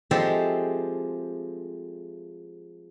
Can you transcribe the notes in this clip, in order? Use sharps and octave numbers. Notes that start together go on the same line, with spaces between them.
F3 G#3 C4 G4 A4 E5